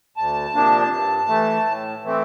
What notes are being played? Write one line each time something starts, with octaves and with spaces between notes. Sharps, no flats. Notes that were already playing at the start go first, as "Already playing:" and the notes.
D2 A5
C3 F3 A#3 D4
G2
E3 A3
A2
E3 A3 C4